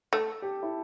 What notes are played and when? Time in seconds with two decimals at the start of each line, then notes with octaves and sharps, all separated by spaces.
0.13 A3 A4
0.42 G4
0.63 E4